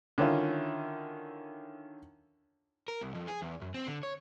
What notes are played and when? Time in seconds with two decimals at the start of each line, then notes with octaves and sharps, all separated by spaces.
0.18 D3 D#3 C#4 E4 F4
2.88 A#4
3.02 C2
3.15 F2
3.28 G#4
3.42 E2
3.62 F#2
3.74 C4
3.87 D3
4.03 C#5